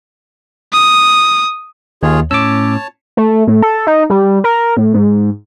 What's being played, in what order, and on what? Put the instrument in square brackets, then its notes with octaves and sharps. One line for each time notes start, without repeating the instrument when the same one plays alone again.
[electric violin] D#6
[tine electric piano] D#2 [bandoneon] F4 G#4 C#5
[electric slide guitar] A2 C#4 [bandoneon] C#5 A5 [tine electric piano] D6 E6
[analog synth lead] A3
A2
A4
D#4
G3
A#4
A2
G#2